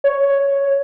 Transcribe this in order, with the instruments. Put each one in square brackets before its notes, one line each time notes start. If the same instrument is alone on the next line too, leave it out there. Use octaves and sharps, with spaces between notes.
[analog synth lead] C#5